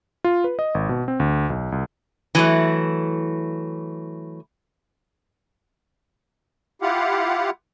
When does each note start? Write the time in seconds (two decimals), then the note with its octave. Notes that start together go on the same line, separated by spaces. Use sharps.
0.24 F4
0.44 B4
0.59 D#5
0.75 G#1
0.89 B2
1.08 C4
1.20 D2
1.50 B1
1.72 C2
2.35 E3 F#3 A3
6.82 E4 F4 G4 F5 F#5